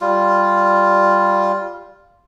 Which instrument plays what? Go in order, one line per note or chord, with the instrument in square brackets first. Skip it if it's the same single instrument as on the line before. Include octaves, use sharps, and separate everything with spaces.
[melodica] G3 F4